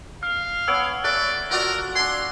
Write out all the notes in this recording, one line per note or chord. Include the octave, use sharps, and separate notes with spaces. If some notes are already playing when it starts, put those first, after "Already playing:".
F5 F6
B3 C#5 G#5 E6 D7
A4 C#5 D5 E5 F#6
F4 F#4 A#4 D5
D4 G#5 C6